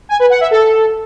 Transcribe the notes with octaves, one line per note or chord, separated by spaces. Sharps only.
G#5
B4
F#5
E5
A4